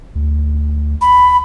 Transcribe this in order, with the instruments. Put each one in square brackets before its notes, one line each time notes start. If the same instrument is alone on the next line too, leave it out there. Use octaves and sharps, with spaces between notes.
[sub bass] D2
[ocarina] B5